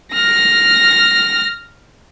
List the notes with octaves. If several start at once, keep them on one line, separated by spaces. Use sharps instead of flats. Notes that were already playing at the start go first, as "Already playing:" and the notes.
F6 A#6